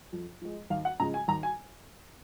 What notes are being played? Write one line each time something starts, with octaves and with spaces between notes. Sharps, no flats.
F2
F3 G#3
D#2 F5
F#5
C#3 F3 G#3 A#5
G#5
D#2 A#5
G#5